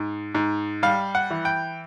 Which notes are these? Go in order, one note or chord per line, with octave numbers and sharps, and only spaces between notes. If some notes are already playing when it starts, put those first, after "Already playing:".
Already playing: G#2
G#2
G3 F5
F#5
E3
G5